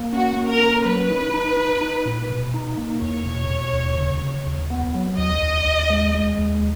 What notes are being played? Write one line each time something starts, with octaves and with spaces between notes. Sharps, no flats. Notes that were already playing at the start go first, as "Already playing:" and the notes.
Already playing: A#3
C#4 F#4
A#3
A#4
C#4
F#3 B4
D#4
D#4
D#4
D#4
A#2
B2
D#4
A#3
E2 C#5
B2
B2
D#2
C#3
C#3
D#2
B3
F#3
D#2 D#5
D#2
D#2
G#3
G#3
D#2